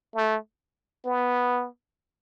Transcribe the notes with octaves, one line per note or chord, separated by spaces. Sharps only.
A3
B3